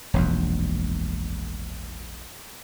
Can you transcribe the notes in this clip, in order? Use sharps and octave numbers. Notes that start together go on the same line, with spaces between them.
E1 A#1 F#2